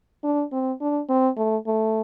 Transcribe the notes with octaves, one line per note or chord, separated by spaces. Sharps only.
D4
C4
D4
C4
A3
A3